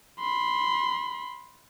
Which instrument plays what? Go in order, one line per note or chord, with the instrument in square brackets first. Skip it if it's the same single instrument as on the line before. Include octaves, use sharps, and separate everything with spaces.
[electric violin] B5 C6